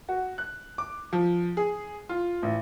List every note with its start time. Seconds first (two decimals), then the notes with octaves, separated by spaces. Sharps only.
0.09 F#4
0.38 F#6
0.78 D6
1.13 F3
1.57 G#4
2.09 F4
2.42 A1